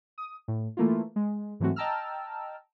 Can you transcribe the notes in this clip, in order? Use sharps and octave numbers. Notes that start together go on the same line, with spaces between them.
D#6
A2
E3 A3 A#3 E4 F4
G#3
G#2 E3 F#3 A3 C4 F#4
D#5 G5 A5 A#5 E6 F6